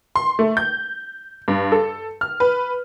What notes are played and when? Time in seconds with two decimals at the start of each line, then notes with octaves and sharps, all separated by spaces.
0.15 C6
0.39 A3
0.57 G6
1.48 G2
1.72 A4
2.21 F6
2.40 B4